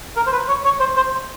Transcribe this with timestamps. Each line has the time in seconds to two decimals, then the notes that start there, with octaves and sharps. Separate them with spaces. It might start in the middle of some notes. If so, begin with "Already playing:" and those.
0.16 A#4
0.26 C5
0.32 B4
0.48 C#5
0.64 C#5
0.80 C5
0.97 C5